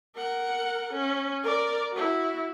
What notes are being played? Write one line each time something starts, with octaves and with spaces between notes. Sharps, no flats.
A#4 F#5
C#4
A#4 D5
E4 F#4